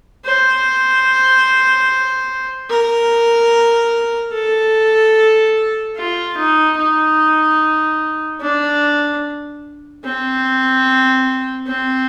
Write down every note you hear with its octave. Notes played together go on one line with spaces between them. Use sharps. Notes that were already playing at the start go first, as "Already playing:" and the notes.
C5
A#4
A4
F4
D#4
D#4
D4
C4
C4